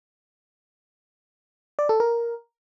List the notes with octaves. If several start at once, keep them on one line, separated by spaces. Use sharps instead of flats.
D5
A4
A#4